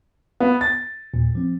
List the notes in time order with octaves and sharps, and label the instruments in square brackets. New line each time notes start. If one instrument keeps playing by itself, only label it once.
[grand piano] B3
A6
[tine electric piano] D#2 A#2
F3 C4